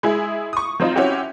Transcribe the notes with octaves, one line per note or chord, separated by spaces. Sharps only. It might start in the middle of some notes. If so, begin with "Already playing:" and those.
G#3 E4 G#4
C#6 D#6
F#3 C4 D#4 F4
C4 C#4 E4 F#4 G4